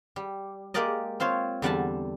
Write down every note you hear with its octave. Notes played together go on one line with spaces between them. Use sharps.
G3
G#3 A#3 G4 A#4 D5 D#5
C4 F4 C5 C#5
E2 D3 G3 F#5 G#5 A5